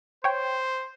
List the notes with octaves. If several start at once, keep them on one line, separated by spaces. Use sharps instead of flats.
C5 C#5 G5